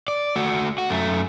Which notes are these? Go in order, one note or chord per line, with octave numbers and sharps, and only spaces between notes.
D5
A3 F#4
F#4
F#2 A3